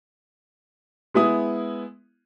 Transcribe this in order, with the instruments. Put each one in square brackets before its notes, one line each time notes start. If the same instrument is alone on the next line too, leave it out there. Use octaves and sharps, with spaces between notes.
[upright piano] G#3 B3 E4 D#6